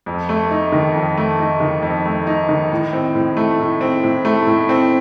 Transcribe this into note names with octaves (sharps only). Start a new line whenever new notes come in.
F2
A3
D#4
D#3
F2
A3
D#4
D#3
F2
A3
D#4
D#3
A2
C4
A2
A3
A2
C4
A2
A3
A2
C4